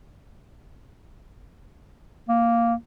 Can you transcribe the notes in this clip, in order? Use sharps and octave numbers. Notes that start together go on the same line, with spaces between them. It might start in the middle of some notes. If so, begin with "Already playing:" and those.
A#3